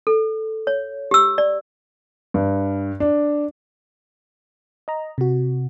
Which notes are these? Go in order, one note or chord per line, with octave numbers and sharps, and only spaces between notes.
A4
C#5
G4 E6
D5
G2
D4
D#5 A#5
C3 F#4